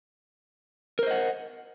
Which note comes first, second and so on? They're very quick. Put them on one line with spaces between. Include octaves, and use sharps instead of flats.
A#4 C5 D#5 F#5